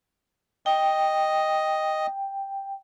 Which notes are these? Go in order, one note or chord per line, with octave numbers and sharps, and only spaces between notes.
D#5 G5